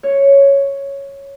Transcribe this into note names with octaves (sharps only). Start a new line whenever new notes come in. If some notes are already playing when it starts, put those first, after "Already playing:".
C#5